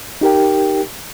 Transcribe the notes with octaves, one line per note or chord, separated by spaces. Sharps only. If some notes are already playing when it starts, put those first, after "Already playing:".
D#4 G4 A#4 G5